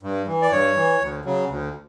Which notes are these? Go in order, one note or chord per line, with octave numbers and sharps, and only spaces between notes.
G2
E3
D5
G2 C#5
E3
D2
C#3 F#3
D2